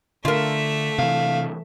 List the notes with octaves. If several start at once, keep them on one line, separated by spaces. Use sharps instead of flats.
D3 A3 F4 A#4 E5
C3 E3 F5